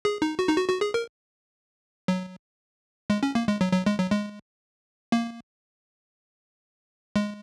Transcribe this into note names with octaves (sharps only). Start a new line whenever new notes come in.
G#4
D#4
F#4
D#4
F#4
F#4
G#4
A#4
F#3
G#3
C#4
A#3
G#3
F#3
F#3
G#3
F#3
G#3
A#3
G#3